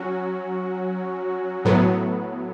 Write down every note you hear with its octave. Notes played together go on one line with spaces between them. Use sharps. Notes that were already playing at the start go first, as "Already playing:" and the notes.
Already playing: F#3 C#4 F#4
A2 F#3 B3